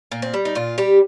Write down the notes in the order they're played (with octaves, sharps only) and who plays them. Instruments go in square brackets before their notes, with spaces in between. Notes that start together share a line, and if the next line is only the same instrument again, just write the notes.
[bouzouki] A#2 A#3
C4
G3
D#4
A#2 F4
G3 G4